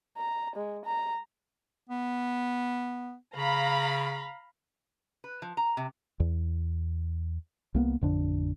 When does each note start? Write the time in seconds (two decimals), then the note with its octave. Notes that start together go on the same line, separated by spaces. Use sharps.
0.18 A#5
0.56 G#3
0.86 A#5
1.89 B3
3.36 C#3 F5 A#5 B5
5.24 B4
5.42 F3
5.57 A#5
5.77 C3
6.20 E2
7.75 C2 A#3 B3
8.01 A1 F2 D3 D4